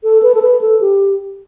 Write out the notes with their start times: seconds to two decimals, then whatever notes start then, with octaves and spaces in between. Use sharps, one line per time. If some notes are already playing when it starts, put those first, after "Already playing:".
0.04 A4
0.23 B4
0.35 A4
0.42 B4
0.61 A4
0.81 G4